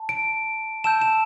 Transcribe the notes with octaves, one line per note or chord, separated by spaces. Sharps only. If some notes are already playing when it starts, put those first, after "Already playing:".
Already playing: A5
D7
A5 E6 G6 E7
E7